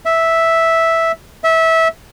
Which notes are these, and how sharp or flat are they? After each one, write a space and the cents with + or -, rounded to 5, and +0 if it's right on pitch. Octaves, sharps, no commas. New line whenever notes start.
E5 -5
E5 -20